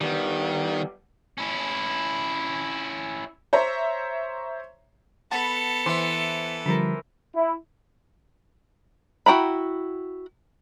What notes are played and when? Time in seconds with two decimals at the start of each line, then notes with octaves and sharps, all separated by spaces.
0.01 D#3 G3 B3
1.38 C#4 E4
3.53 C5 C#5 E5 A#5
5.31 B3 A4 F#5 A5 B5
5.86 E3 C5 E5 C6
6.66 D3 F3 G3 A#4 C5 B5
7.35 E4
9.26 E4 F#4 G5 A#5 B5